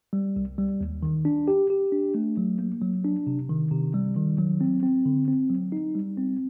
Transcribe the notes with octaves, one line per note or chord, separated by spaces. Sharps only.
G3
C2
G3
D#2
D#3
D4
G4
G4
D4
A3
F#3
A#3
F#3
D4
C3
D#3
C3
G3
D#3
F#3
C4
C4
D3
C4
F#3
D#4
G3
C4